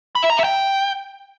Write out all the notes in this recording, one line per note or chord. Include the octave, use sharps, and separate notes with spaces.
B5
E5
A#5
E5
G5